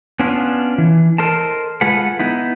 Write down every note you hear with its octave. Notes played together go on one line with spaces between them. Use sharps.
B3 C#4 D4 F4
E3
A4 A#4 C5 D#5 A5
G#3 F4 G#4 A4 B4 F#5
B3 D#4 E4